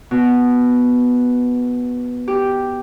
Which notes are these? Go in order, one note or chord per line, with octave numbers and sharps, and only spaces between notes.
B2
G4